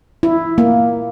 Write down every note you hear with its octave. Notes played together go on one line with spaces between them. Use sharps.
E4
A#3